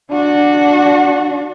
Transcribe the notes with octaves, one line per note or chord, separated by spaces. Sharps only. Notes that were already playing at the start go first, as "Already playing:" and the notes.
D4 F#4